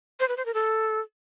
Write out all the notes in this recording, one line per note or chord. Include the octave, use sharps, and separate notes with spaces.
C5
B4
C5
A#4
A4